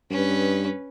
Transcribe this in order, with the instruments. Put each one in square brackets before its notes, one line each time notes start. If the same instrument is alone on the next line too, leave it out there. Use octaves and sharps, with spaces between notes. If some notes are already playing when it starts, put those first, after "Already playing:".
[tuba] G2 [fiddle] C#4 B4